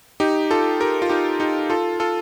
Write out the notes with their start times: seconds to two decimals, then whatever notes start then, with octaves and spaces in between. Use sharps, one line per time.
0.20 D#4 G4
0.51 F4 A4
0.80 G4 A#4
1.02 F4
1.09 D#4 G4
1.40 D#4 G4
1.70 F4 A4
2.00 F4 A4